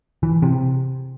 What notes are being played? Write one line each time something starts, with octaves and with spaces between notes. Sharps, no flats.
E3
C3